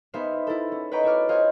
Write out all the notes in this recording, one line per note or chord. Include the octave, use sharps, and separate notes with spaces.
B3 D#4 G#4 C5 E5 F5
E4 A4
C#4
B4 C#5 D#5 G5 A#5 C#6
F#4 A4 C#5 D6 F6
F4 G#4 C5 C#5 D#5 F5